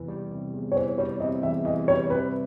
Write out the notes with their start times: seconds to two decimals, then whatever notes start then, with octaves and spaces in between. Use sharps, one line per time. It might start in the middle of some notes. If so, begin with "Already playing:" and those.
Already playing: E2 C3 E3
0.08 G3
0.31 C3
0.54 E2
0.72 C#5
0.76 E3 C5
0.98 G3 C#5
1.20 C3 D#5
1.43 E2 E5
1.65 E3 D#5
1.88 G3 C#5
2.10 C3 B4